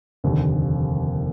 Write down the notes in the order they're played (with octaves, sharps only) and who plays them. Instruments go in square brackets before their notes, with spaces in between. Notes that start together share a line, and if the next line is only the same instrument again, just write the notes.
[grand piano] F1 D#2 D3